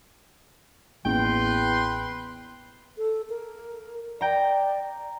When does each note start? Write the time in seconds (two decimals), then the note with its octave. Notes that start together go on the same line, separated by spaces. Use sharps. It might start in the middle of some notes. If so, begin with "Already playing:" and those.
1.05 A1 E2 A#3 C#4 B4 G5 C6
2.98 A4
3.30 A#4
4.21 D5 G5 A#5